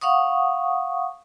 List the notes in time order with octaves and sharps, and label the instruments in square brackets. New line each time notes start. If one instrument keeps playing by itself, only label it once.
[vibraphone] F5 F#5 C#6 D#6